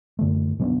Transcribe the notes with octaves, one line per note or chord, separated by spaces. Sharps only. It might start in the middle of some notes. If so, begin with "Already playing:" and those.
F#2 D3 A3
B2 F#3 B3 D4